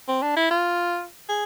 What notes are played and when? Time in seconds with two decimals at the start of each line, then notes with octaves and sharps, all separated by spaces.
0.08 C4
0.22 D4
0.36 E4
0.51 F4
1.29 G#4